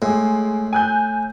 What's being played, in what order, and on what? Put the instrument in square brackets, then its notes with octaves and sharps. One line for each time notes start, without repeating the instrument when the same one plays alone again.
[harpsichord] A2 [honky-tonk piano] G#3
[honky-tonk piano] G#5 F#6 G6